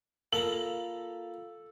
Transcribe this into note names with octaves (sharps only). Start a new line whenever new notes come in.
A#3 F4 A4 F5 A5 A#5 F#7